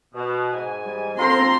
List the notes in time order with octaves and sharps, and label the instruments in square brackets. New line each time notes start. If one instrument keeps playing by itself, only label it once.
[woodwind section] B2
G#2 G#5
[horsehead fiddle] G3
[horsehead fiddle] C4 A#5 [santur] F4 A4 C5 [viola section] C6